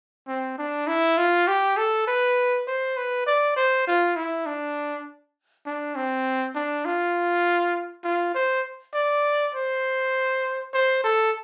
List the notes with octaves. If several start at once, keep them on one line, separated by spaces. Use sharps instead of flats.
C4
D4
E4
F4
G4
A4
B4
C5
B4
D5
C5
F4
E4
D4
D4
C4
D4
F4
F4
C5
D5
C5
C5
A4